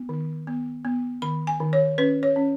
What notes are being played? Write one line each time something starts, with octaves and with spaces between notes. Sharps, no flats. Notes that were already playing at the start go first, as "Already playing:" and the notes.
Already playing: B3
D#3
B3
B3
D#3 B5
G#5
D#3
C#5
C#4 B4
C#5
C#4